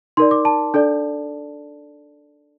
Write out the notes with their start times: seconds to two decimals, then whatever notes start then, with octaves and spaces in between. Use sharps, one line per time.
0.17 D#4 A#4 D5 C6
0.31 D6
0.45 A5
0.74 D4 A4 D5